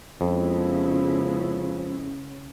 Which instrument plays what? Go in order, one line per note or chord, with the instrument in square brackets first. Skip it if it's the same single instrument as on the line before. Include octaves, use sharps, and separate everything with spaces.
[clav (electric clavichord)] F2 [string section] C#3 [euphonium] F3 [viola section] G#3 B3 E4